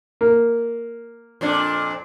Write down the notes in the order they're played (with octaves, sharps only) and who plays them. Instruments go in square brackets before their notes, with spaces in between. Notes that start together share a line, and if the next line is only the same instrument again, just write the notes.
[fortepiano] A#3
[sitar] F2 A#2 D4